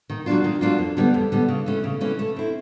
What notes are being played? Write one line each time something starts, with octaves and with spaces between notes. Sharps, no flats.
D#3
F#3 A#3 D4 F4
D#3
F#3 A#3 D4 F4
F2
D3 G3 B3
F2
D3 G3 B3
C#3
E3 A3 C#4
C#3
E3 A3 C#4
A3
C4 E4